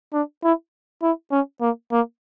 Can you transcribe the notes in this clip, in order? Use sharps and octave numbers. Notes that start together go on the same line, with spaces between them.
D4
E4
E4
C#4
A#3
A#3